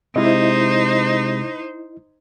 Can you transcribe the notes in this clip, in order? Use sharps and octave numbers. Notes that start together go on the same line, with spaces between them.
C3 G#3 D#4 E4 C5 D#5